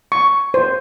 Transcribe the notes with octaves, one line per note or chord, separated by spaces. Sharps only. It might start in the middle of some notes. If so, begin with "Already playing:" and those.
C#6
C5